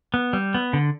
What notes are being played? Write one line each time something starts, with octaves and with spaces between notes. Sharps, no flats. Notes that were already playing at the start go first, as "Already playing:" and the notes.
B3
G3
B3
D3